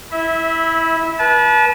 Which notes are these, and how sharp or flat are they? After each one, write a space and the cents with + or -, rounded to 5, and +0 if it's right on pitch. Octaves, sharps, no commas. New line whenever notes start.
E4 -10 E5 -25
B4 -35 A5 -30